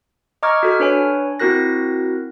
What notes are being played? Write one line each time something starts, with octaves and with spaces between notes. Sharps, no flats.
D#5 A#5 C#6 D6 F6 G#6
F#4 A4 F6
D4 B4 C#5 G#5
C4 E4 F#4 A#4 F#6 A#6